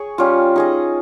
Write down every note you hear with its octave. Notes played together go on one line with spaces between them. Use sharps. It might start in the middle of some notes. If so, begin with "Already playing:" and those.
Already playing: G#4 C#5
G3 C#4 F4
D#4 G#4 D#5